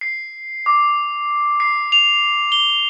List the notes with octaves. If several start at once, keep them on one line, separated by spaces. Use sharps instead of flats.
C7
D6
C7
F7
G7